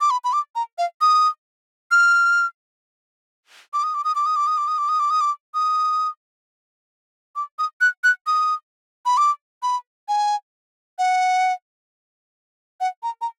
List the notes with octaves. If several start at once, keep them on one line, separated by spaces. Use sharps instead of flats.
D6
B5
B5
D6
A#5
F5
D#6
F6
D6
D#6
D6
D#6
D6
D#6
D6
D#6
D6
D#6
D6
D#6
D6
D#6
D6
D#6
D6
D#6
F#6
F#6
D#6
B5
D6
B5
G#5
F#5
F#5
A#5
A#5